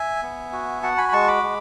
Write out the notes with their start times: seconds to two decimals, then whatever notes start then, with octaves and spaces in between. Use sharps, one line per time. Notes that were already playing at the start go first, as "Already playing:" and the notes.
Already playing: E5 G#5
0.23 B3
0.53 F#4
0.83 F#4 F#5 A5
0.98 G#5 B5
1.09 B5
1.13 G#3 A5 C#6
1.28 B5 D6
1.43 G#3